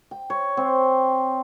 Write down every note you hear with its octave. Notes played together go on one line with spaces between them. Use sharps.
G5
C#5
C4